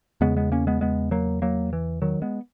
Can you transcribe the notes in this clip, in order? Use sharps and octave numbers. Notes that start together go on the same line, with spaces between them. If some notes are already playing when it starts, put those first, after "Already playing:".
E2 C#3 G#3 B3
G#3 B3
A#3 C#4
G#3 B3
G#3 B3
F#3 A#3
F#3 A#3
E3
D#3 F#3
G#3 B3